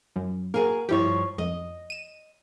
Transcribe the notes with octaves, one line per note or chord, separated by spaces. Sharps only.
F#2
A#3 F#4 G#4 A#4
G2 F3 E4 G4 C#5
F2 D#5
D#7 E7